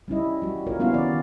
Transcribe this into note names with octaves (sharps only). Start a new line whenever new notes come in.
G3 C#4 E4 D#5
G3 F#4
A#3 F4 F#4 A#4 C#5
G3 B3 C#4 E4 F#4 F5
D#3 G3 D5